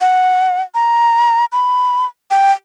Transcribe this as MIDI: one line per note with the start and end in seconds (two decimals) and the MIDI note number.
0.01 0.62 78
0.75 1.45 82
1.52 2.06 83
2.31 2.52 79